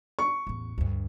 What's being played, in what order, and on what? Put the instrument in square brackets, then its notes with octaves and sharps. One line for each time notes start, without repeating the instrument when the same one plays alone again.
[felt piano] C#6
[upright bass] A1 E2
D2 G2